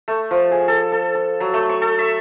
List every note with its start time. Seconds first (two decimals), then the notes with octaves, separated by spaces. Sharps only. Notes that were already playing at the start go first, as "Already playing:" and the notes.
0.08 A3
0.31 F3
0.51 G#4
0.68 A4
0.92 A4
1.15 A4
1.40 F#3
1.54 A3
1.69 C#6
1.82 A4
1.99 E5